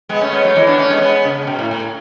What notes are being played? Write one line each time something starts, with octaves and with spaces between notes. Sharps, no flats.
G#3 B3
A3 C#4
G#3 B3
F#3 A3
E3 G#3
B3 D4
A3 C#4
G#3 B3
G#3 B3
C#3
B2
A2
A2